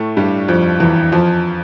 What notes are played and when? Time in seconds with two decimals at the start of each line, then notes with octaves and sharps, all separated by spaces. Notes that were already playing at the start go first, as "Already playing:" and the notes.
Already playing: A2 A3
0.17 G2 G3
0.48 F2 F3
0.80 E2 E3
1.12 F2 F3